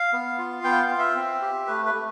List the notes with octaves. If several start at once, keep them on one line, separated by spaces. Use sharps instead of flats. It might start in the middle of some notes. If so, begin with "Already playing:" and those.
Already playing: F5
B3
F4
B3 G5
F5
F4
E5
C4
G4
A3 B4
B4
A3